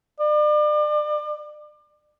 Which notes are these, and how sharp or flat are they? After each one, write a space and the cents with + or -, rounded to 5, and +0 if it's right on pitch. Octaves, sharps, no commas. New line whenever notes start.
D5 +35